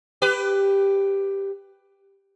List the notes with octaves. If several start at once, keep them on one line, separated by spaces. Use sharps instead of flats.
G4 B4